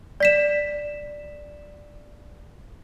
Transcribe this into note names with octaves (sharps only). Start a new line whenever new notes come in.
D5 B6 E7